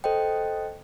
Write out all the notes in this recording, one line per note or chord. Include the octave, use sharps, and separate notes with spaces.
A4 C5 D#5 G5